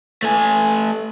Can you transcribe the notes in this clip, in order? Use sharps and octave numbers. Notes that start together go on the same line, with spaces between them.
A3 G#5